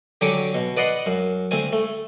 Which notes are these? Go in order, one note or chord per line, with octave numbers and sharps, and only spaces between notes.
D3 F#3 G4 G#5 C#6 D6
B2
B4 D5 D#5 F#5 C6
F#2
D2 C4 G#5
A3